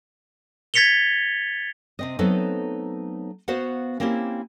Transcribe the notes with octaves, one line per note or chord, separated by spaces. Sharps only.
G#6 A6 B6 C#7 F7 G7
C3 C4 D#5
F#3 A3 B3 C4 D#4 A4
B3 F#4 C5 F5 F#5
A#3 C4 C#4 E4 G4